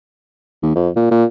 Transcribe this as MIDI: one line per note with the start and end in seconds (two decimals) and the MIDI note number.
0.63 0.73 39
0.76 0.89 41
0.96 1.06 46
1.11 1.25 46